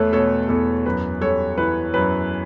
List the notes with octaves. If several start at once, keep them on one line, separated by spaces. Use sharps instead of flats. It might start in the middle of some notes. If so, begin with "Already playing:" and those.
Already playing: E2 A3 A4 B4 C#5
B2 A4 C#5
E2 A4
F#2 B4
G3 A4 C#5
E3 B4
F#2 B4